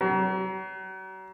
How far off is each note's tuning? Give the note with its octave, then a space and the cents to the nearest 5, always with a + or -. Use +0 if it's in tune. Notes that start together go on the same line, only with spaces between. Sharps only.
F#3 +40